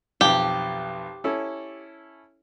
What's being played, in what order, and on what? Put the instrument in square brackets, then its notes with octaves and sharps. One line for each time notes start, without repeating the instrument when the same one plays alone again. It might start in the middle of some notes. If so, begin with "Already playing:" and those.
[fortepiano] B1 F2 [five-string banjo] G4
[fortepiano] C#4 E4 A4